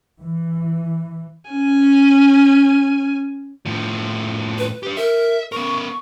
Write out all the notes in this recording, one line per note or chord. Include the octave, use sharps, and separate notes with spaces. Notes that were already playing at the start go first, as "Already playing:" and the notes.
E3
C#4 G#5
A2 F3
B4
G4 B4
A#4 E5
B3 A#4 C#6